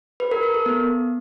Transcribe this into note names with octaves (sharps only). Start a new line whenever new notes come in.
B4
A#4
A#4
A4
B3